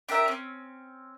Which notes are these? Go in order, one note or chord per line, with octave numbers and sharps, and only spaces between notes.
D4 G4 A#4 E5
C4 C#4